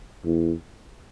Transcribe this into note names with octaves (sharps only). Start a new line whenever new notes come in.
E2